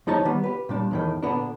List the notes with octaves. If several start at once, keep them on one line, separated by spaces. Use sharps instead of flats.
D2 F3 D#4 C#5 A5 A#5
D#3 G3 B3
G4 B4
A#2 G3 D4
E2 A2 D#3
A#2 D3 B3 D4